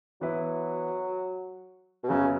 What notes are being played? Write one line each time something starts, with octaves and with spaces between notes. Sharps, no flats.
E3 F#3 B3 E4 B4
B2
F#2 C#3 F#3 B3